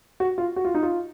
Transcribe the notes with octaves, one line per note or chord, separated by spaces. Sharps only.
F#4
F4
F#4
F4
D#4
F4